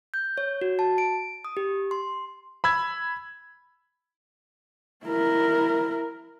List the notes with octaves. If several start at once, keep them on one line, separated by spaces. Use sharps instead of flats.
G6
C#5
F#4
A5
D7
D#6
G4
C6
B5 E6 G#6
E4 A#4